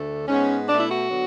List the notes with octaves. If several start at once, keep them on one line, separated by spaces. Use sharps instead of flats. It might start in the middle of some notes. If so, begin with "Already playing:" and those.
Already playing: D2 D3 A3
G#2 G#3 B3 C#4
B2 A3 D4
E4
F#4
D3 F#3 B3